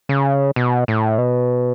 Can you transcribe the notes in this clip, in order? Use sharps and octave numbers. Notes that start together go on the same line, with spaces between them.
C#3
B2
A2
B2